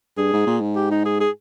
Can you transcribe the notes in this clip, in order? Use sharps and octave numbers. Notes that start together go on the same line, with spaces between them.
G2 G#4
G#2
A#2
G#2
G4
D#4
G#4
G#4